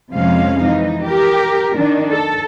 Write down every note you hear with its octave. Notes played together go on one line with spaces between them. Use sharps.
F2 C3 F3 G#3 C#4 F5
E3 D#4
G4 A#4
D#3 D4
A4